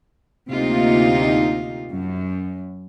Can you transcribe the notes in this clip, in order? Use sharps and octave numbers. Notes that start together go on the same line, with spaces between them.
D2 C3 A#3 D#4 F4
F#2